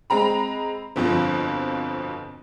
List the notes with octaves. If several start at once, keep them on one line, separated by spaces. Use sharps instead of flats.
G#3 C4 A#5 B5
G1 F2 B2 F3